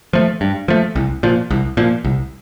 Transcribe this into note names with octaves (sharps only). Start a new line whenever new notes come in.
F3 A3
G2
F3 A3
C2
A#2 F3
C2
A#2 F3
C2